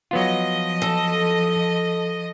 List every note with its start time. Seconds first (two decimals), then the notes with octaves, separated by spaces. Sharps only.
0.11 F3 F#3 B3 F4 D#5
0.82 A4